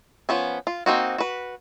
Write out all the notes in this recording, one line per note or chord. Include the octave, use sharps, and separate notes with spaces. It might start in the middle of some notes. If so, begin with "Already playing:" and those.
F3 B3 C#4
F4
A#3 C4 D#4 F#4
F#4 B4